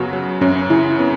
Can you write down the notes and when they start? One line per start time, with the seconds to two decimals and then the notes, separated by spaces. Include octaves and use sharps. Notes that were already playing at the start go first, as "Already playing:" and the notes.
Already playing: F#2 C#3 F#3 B3 F#4
0.13 F#3
0.41 F#2 C#4
0.70 C#3 E4
0.99 B3 C#4